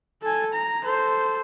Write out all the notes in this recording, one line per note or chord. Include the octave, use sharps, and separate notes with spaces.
A4 G#5
A#5
A4 C5